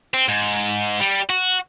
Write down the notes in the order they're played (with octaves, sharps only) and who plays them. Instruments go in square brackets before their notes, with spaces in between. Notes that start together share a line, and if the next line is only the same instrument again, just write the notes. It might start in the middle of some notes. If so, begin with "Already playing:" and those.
[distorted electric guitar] C4
G#2
G3
F#4